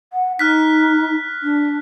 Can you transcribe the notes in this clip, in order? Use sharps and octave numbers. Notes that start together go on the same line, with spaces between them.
F#5
D#4 F6 F#6 B6
D4